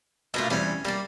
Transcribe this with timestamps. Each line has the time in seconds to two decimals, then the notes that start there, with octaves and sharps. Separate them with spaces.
0.34 B2 A3 A#3 D4 F4
0.50 E2 G3 C4 C#4
0.85 G3 A#3 D5